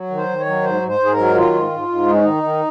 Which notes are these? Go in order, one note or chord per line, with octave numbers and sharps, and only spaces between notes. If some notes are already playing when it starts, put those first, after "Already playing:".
Already playing: F#3
D#3
C5
D#3
C#5
F#3
G#2 C5
G#2
C5
G#2
G#4
A#4
F#3
D#3 F4
G#2
G#2
G#2
G#3 D#4
C#4
D#3 D#4
D#3